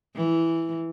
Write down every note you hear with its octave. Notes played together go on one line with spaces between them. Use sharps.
E3